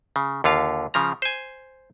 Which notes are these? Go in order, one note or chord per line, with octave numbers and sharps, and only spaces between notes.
C#3
D#2 D3 F4 F5
C#3 F3 A#5
C5 G#5